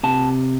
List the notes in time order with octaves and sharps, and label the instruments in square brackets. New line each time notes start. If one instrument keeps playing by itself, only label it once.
[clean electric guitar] C3 A5